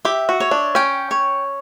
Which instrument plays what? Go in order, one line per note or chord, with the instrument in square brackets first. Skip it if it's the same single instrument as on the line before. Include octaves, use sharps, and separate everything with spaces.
[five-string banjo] G4 [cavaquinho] E5
[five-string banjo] F#4
[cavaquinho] C#5
[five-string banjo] D4
[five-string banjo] C#4 [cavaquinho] G5
[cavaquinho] C#5